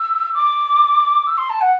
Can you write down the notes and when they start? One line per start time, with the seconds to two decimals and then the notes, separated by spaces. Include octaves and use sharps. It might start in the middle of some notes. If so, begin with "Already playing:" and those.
Already playing: E6
0.34 D6
1.27 E6
1.38 C6
1.50 A5
1.61 F#5